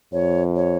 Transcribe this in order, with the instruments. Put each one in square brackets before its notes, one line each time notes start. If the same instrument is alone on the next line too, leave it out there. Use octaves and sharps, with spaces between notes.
[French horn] F2 [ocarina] C#5
[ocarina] C#5